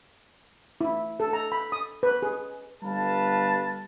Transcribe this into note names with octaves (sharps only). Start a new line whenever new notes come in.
E4
A4
A#5
B5
D#6
B4
G#4
G1 G3 B4 F5 A5